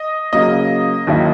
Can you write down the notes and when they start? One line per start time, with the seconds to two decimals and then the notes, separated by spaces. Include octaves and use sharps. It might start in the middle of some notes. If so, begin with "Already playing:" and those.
Already playing: D#5
0.33 C#3 F#3 A#3 D#5
1.07 D#2 D#3 F#3 A#3 E4